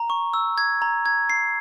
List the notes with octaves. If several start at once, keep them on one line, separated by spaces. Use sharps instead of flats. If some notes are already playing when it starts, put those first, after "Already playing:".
Already playing: A#5
C#6
E6
G#6
A#5
G#6
C7